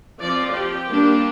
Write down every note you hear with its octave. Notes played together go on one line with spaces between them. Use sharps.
F3 C4 F4 D5
G4
G3 A#3 D4 F4